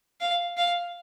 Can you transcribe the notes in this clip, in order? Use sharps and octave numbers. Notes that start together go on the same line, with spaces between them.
F5
F5